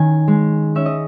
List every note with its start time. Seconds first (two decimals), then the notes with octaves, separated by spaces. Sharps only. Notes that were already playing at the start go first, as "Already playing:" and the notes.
Already playing: D#3 C#4 G#5
0.28 G#3
0.75 C#4 E5
0.86 D#5